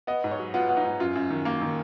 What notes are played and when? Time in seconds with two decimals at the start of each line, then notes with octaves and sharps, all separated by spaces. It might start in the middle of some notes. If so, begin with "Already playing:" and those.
0.07 B3 D#5
0.24 G#2
0.31 C#5
0.39 F#3
0.54 B3 F4
0.69 B3
0.77 D#4
0.84 G#2
1.00 F#2 F4
1.16 F#2
1.30 D#3
1.45 A#3
1.61 D#3